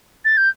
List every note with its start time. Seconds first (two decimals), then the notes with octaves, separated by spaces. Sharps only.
0.25 A6
0.37 G6